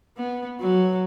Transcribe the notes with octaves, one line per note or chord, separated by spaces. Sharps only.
B3
F#3